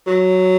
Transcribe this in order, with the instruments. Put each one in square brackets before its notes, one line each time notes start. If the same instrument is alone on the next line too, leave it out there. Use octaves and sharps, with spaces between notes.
[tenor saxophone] F#3